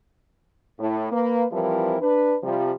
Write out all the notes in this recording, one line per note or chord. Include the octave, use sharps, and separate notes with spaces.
A2
A#3 B4
E3 F3 G3 C4 E4 A#4
D4 B4
C3 F3 G3